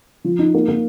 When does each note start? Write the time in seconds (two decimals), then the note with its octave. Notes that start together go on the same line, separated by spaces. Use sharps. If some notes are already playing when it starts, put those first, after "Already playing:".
0.24 F3
0.39 D#4
0.54 A#3
0.68 A#3